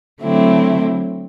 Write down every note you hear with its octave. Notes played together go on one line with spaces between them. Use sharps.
D3 F#3 A3 C4 E4